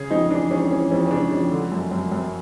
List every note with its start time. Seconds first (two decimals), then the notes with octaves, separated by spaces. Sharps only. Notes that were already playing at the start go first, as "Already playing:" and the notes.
Already playing: C#3 G#4
0.11 F2 D#4
0.30 E3 D4
0.51 F2 C#4
0.71 E3 C#4
0.91 F2 C#4
1.07 C#4
1.11 C#3 D4
1.31 F2
1.52 D3
1.72 F#2
1.91 F#2
2.12 F#2